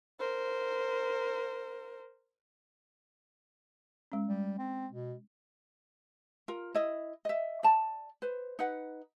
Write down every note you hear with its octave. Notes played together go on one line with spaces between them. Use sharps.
A#4 C5
G#3 C#4
G3
C4
B2
F4 A#4
E4 D#5
D#5 E5
D5 A5
B4 C5
D#4 B4 F#5